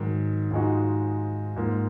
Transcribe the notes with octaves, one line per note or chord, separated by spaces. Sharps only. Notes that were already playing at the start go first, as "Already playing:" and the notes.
Already playing: G#2 D#3 F#3
G#2 F3 G#3 D#4 F#4
G#2 F3 A#3